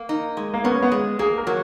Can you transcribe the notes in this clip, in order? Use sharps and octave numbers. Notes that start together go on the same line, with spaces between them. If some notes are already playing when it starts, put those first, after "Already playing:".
Already playing: A#3
D#4
G#3
A#3
B3 C#4
B3
G#3
A#3 G#4
A#4
F#3